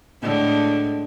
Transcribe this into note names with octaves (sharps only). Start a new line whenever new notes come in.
A2 D3 G#3